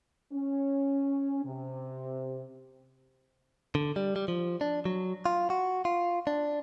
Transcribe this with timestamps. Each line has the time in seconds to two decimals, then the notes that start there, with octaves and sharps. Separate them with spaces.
0.33 C#4
1.44 C3
3.75 D3
3.96 G3
4.16 G3
4.28 F3
4.61 D4
4.85 F#3
5.26 F4
5.50 F#4
5.85 F4
6.27 D4